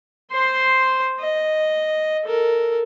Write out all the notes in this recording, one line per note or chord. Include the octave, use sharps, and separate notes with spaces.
C5 C6
D#5
A4 A#4